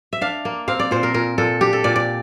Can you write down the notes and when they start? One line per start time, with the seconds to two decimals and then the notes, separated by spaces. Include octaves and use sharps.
0.13 E5
0.21 D4 F5
0.45 A#3
0.68 C4 F5
0.80 D5
0.91 A#2 C5
1.03 A#4
1.14 A#2 A#4
1.38 A#2 A4
1.61 D4 G4
1.73 A4
1.84 A#2 D5
1.96 D5